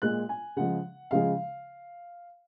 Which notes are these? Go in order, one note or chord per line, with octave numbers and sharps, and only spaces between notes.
A#2 G#3 F#6
G#5
C#3 F3 G#3 F#5
C#3 F3 G#3 F5